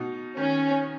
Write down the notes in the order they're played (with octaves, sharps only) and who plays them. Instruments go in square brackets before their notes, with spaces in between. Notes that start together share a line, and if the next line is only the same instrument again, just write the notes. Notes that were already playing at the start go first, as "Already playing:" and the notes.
Already playing: [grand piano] B2 D#4
[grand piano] D#3 [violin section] C#4